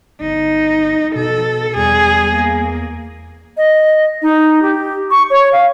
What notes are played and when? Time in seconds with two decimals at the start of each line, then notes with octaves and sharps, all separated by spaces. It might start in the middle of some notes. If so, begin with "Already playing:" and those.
0.21 G1 D#4
1.15 B2 A4
1.76 E2 G3 G#4
2.34 A#3
3.57 D#5
4.22 D#4
4.62 G4
5.11 C#6
5.30 C#5
5.53 F5